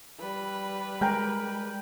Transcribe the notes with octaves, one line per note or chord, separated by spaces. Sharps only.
G3 B4
G#3 A#4 G5 A#5